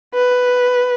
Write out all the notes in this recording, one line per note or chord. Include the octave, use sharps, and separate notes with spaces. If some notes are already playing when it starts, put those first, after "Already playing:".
B4